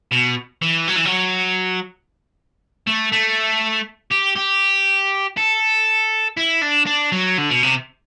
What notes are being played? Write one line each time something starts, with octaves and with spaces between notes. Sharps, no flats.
B2
E3
F#3
E3
F#3
A3
A3
G4
G4
A4
E4
D4
D4
F#3
D3
B2
C3